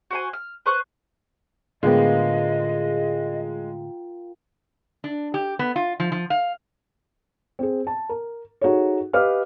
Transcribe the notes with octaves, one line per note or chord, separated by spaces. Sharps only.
F#4 C5 G#5
F6
B4 C5 C#6 F#6
A2 D3 G#3 B3 F4 A#4 D#5 G5
D4
G4
B3
F4
F3
F3
F5
C4 G#4
A5
A#4
D#4 F#4 G#4 A4 C#5
G4 B4 D#5 F5 D6 F6